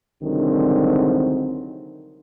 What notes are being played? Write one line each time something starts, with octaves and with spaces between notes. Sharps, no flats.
C2 D3 D#3 F#3 G#3 C4